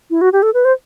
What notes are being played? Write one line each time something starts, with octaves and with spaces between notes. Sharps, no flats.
E4
F#4
G4
A4
B4
C5